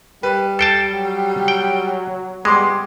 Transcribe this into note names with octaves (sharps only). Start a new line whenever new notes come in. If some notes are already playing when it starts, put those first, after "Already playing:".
G3 B4
A4 G5 A5 C7 D7
F#3
G5
G3 G#3 B3 C6 D6 C7